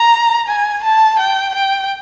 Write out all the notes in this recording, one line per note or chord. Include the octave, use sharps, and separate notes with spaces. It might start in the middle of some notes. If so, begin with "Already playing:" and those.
Already playing: A#5
G#5
A5
G5
G5